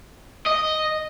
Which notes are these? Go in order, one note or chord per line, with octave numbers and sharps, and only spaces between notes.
D#5